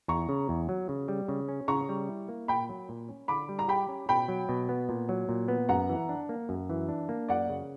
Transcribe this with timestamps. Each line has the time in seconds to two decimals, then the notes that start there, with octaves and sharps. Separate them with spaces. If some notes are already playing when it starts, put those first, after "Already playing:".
0.08 E2 A#5 C#6
0.29 C#3
0.49 E2
0.69 F#3
0.89 C#3
1.08 G3
1.28 C#3
1.49 C#4
1.68 C#3 A#5 C#6
1.89 G3
2.09 E4
2.28 A#3
2.48 A#2 G5 B5
2.69 F#3
2.89 A#2
3.09 C#4
3.28 D3 B5 D6
3.49 G3
3.59 A#5
3.68 G4 G5 B5
3.89 C#4
4.09 B2 G5 B5
4.28 F#3
4.49 B2
4.69 B3
4.89 A#2
5.09 F#3
5.29 A#2
5.48 B3
5.69 F#2 F#5 A#5
5.89 E3
6.09 D4
6.29 A#3
6.49 F#2
6.70 E3
6.89 D4
7.09 A#3
7.28 F#2 D5 F#5
7.49 C#3